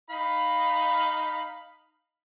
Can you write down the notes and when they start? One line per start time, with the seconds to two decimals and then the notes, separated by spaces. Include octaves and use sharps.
0.10 D#4 F5 B5